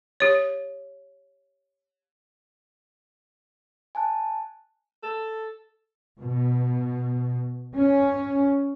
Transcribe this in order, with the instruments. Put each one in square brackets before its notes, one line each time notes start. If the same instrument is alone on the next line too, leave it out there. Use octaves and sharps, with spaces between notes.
[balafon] G4 C#5
[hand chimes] G#5 A5 F#6
[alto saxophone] A4
[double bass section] B2
C#4